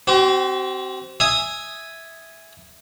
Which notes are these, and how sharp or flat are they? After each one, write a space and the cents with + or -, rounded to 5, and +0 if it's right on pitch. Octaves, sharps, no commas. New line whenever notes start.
C4 +0 F#4 +45
E5 +0 G#5 +0 D#6 +0